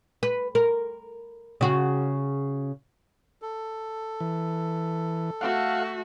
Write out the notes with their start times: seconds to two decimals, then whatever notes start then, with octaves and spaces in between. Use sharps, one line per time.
0.23 B4
0.55 A#4
1.61 C#3 F#4
3.42 A4
4.20 E3
5.41 A3 F#4 F5 F#5